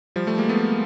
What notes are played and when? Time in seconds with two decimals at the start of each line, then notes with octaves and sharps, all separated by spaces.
0.16 F3 G3
0.27 G3 A3
0.38 G#3 A#3
0.49 A3 B3